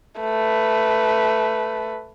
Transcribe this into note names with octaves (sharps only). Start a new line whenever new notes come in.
A3 B4